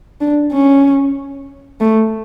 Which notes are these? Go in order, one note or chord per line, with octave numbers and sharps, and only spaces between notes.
D4
C#4
A3